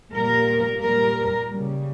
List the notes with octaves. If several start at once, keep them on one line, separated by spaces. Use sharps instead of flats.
A#2 G3 A#4
A#2 G3 A#4
C#3 G3